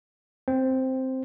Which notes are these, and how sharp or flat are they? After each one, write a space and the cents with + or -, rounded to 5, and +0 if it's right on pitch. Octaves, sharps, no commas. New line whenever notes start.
C4 +0 C5 +0